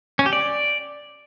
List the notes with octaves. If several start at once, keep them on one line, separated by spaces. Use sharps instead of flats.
C#4
G4
D5